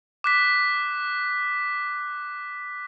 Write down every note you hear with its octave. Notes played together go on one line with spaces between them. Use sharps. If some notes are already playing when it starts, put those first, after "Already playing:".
D6 F#6 B6